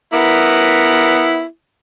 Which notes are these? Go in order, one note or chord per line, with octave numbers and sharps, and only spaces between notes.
B3 E4 A#4